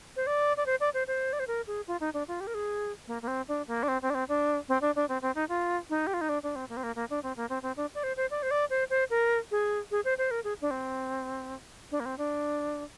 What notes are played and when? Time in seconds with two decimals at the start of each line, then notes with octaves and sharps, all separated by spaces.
0.16 C5
0.27 D5
0.57 D5
0.66 C5
0.80 D5
0.94 C5
1.07 C5
1.33 D5
1.40 C5
1.47 A#4
1.67 G#4
1.88 F4
2.00 D#4
2.14 D4
2.28 F4
2.40 G4
2.47 A#4
2.54 G#4
3.07 A#3
3.22 A#3
3.28 C4
3.48 D4
3.68 A#3
3.83 D4
3.88 C4
4.02 C4
4.10 D4
4.15 C4
4.29 D4
4.69 C4
4.82 D4
4.96 D4
5.09 C4
5.22 C4
5.35 D#4
5.49 F4
5.90 D#4
6.07 G4
6.14 F4
6.21 D#4
6.29 D4
6.43 D4
6.56 C4
6.69 A#3
6.77 C4
6.83 A#3
6.96 A#3
7.10 D4
7.23 C4
7.37 A#3
7.50 C4
7.63 C4
7.77 D4
7.95 D5
8.04 C5
8.17 C5
8.31 D5
8.43 C5
8.51 D5
8.70 C5
8.90 C5
9.10 A#4
9.51 G#4
9.91 G#4
10.05 C5
10.18 C5
10.31 A#4
10.44 G#4
10.61 D4
10.71 C4
11.91 D4
12.00 A#3
12.06 C4
12.18 D4